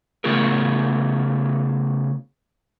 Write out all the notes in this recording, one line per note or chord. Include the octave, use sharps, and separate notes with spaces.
C#3 A3 B3 F4 G#4 A#4